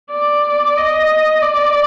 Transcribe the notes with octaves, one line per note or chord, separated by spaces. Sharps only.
D5
D#5
D5